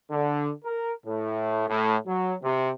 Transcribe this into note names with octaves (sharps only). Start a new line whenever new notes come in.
D3
A#4
A2
A2
F#3
C3